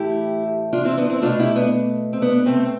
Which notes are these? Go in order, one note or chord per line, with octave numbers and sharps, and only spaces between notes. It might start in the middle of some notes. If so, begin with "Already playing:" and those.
Already playing: A2 E3 A3 E4 G4
D4 F4
C4 E4
B3 D4
C4 E4
B2 A3 D4 F4
E4 G4
B3 D4
C4
B3 D4
A3 C4